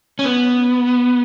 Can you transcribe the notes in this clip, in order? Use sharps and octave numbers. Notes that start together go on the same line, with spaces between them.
C#4
B3